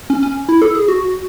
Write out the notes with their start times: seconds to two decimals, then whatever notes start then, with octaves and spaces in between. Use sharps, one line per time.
0.10 C#4
0.23 C#4
0.49 E4
0.62 A4
0.75 G#4
0.88 F#4